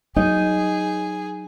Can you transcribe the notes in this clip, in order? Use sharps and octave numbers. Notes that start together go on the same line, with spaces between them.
F#3 D#4 G#4